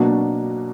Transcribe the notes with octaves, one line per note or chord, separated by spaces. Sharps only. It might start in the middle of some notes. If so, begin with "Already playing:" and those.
Already playing: B2 F#3 A#3 D4 F#4